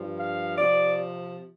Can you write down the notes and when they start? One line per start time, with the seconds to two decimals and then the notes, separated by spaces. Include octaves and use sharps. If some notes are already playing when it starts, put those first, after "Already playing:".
Already playing: G2 F3
0.19 F5
0.58 C3 F3 D5